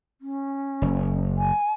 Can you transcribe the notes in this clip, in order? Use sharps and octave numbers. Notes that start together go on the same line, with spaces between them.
C#4
F#1
G#5